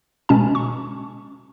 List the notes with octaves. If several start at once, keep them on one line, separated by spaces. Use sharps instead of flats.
B2 G#3 C#4 A5
C#6